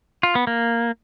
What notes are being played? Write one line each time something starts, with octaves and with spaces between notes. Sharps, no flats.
F4
B3
A#3